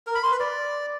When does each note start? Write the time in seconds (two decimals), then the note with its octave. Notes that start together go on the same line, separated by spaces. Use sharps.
0.07 A#4
0.15 B5
0.23 C6
0.31 B4
0.40 D5